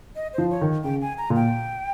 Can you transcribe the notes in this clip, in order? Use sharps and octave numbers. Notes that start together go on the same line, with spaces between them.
D#5
F3 C5
C#5
D#3
C#3 G5
G#5
A#5
A#2
G5